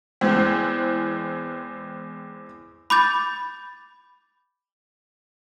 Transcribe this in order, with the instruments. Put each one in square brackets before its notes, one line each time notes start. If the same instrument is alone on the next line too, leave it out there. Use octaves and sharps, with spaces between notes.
[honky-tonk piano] E2 E3 G#3 C4
[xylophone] B5 D6 G6 A6